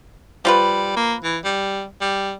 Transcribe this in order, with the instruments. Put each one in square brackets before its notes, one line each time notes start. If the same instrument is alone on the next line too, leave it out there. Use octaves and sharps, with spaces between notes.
[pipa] F3 F4 B4 [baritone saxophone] G3
[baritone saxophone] A#3
E3
G3
G3